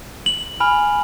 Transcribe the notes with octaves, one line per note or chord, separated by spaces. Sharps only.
F#7
G#5 B5 F6